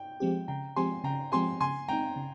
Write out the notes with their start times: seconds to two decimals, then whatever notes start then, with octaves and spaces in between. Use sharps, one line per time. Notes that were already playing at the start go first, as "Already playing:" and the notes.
Already playing: G5
0.20 F3 G#3 C4 G4
0.48 C#3 G5 A#5
0.76 F3 G#3 C4 G4 G#5 C6
1.04 C#3 G5 A#5
1.32 F3 G#3 C4 G4 G#5 C6
1.61 C#3 G#5 C6
1.88 G#3 C4 D#4 G5 A#5
2.16 C#3